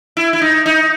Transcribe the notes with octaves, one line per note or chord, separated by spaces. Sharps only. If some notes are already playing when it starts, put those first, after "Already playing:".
E4
E4
D#4
D#4